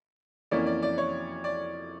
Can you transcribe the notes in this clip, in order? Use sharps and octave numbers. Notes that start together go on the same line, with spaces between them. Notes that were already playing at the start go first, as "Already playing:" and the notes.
F2 E3 A#3 C#4 E4 D5
D5
D5
C#5
D5